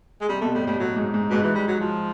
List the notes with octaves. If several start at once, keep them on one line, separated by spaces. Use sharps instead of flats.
G#3
C3 G3
B2 A3
A2 G3
A2 G3
A2 F#3
G#2
G#2
G#2 B2
E3
G3
F#3
F3